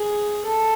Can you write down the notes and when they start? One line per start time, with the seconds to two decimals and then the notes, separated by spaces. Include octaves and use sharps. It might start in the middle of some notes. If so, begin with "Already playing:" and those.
Already playing: G#4
0.45 A4